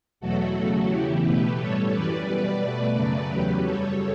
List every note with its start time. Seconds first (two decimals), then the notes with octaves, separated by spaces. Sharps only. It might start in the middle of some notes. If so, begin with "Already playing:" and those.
0.20 E2 B2 F#3 A3 F#4 A4
0.55 E2 C#3 F#3 A3
0.88 E2 C#3 E3 E4 G4
1.22 B2 A3 G4 B4
1.57 A2 G3 A4 C#5
1.91 F#2 E3 G3 B4 D5
2.25 B2 G3 B4 D5
2.59 B2 A3
2.94 F#2 C#3 F#3 A3
3.28 E2 C#3 F#3 G4 B4
3.62 F#2 C#3 G3 A4 C#5